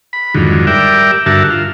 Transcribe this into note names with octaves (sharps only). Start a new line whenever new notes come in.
B5
F2 G#2 D3 D#3 F#3
G3 A#4 D5 E5 G5
G2 D3 F#4 A#4 E5 A5
F4